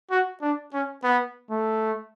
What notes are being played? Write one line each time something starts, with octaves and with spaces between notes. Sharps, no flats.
F#4
D4
C#4
B3
A3